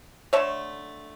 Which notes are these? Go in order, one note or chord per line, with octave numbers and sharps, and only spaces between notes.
D3 A3 C#5 E5